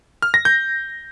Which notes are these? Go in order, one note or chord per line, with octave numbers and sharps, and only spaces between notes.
F6
A#6
G6